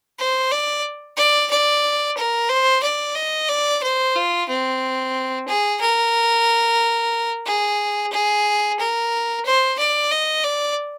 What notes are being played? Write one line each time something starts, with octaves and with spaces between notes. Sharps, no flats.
C5
D5
D5
D5
A#4
C5
D5
D#5
D5
C5
F4
C4
G#4
A#4
G#4
G#4
A#4
C5
D5
D#5
D5